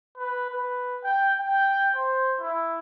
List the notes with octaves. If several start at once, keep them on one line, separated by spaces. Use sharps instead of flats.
B4
B4
G5
G5
C5
E4